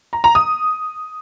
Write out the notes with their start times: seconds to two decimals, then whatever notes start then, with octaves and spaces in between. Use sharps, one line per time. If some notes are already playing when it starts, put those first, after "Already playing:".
0.13 A#5
0.24 A#5
0.35 D#6